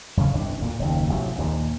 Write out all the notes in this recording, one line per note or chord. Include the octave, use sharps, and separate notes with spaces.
F2 C#3 C#4
G1 C2 D4
D2 A#2
F#1 D#2
A1 C3 F#3
A#1 D#2 A#2